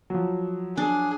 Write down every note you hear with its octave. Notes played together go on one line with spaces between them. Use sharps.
F3 F#3
D4 G#4